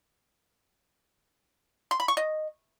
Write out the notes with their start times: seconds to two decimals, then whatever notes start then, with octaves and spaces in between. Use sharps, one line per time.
1.91 C6
2.00 B5
2.08 C#6
2.17 D#5